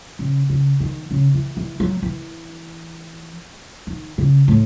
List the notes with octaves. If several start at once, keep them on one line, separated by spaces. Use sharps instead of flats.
C#3
C#3
D#3
C#3
E3
E3
F#3
E3
D#3
C#3
A2